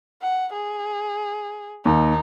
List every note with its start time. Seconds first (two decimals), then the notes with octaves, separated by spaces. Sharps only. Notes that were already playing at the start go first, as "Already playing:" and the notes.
0.22 F#5
0.53 G#4
1.85 D#2 D#4